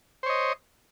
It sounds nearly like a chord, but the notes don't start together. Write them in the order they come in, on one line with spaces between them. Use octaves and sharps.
C5 C#5 D#5